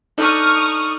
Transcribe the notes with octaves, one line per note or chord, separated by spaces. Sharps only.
D4 D#4 A4 C#6 D#6 F6